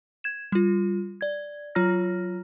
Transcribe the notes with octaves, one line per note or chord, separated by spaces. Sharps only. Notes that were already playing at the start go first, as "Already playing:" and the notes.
G#6 E7
G3 F4
D5 G#6
F#3 F4 C#5 A#5 F6 A#6